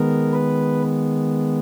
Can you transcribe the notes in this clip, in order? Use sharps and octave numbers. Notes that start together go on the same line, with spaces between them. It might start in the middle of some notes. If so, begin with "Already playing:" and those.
Already playing: D#3 G#3 B3 A#4
B4